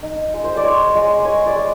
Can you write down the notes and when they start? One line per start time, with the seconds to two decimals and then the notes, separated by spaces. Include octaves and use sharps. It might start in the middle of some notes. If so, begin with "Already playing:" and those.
0.03 D#4
0.34 G#3
0.44 C5
0.56 D5
0.64 D#4 C#5
0.95 G#3
1.25 G#3 C#5
1.46 D5
1.56 G#3